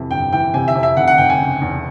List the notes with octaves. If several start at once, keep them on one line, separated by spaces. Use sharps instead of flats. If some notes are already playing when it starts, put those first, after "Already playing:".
Already playing: F2 C3 E3
G1 G5
E3 G5
C3 G#5
E5
F2
E5
F1 F#5
F#5
F1 G5
G#5
C#3
E2